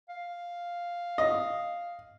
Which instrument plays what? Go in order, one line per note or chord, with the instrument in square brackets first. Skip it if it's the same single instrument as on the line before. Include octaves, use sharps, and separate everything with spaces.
[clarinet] F5
[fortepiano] D#5